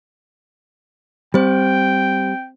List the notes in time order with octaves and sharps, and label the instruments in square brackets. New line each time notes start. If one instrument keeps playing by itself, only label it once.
[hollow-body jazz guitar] G3 [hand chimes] C4 C5 [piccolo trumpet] G5